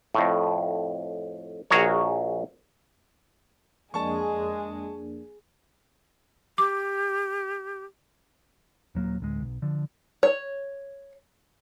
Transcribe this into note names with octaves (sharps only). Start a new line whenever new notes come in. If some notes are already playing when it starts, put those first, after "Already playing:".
F2 A2
A#1 F#4 G#4 A#4 C#5
F2 G#3 A#3 D4 G#4 A5 C#6
G4 D6
D#1 F#3 A#3
D1 D2 G#3
B1
D3 F3
C#5